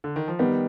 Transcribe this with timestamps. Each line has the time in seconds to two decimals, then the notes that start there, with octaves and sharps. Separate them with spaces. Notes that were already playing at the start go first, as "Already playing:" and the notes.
0.04 D3
0.16 D#3
0.28 F3
0.39 D#3 G3 B3